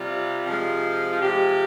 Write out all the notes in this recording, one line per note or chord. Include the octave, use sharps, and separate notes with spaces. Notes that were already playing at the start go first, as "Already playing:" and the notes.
Already playing: C3 G3 F4
C3 F3 G#3
F4
C3 F3 G#3 G4